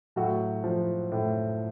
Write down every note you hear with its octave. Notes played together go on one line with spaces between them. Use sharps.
A2 F#3 F#4
F3
A2